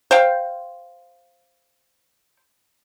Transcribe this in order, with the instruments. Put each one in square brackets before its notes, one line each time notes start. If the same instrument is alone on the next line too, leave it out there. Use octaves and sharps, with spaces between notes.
[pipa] C5 F5 G5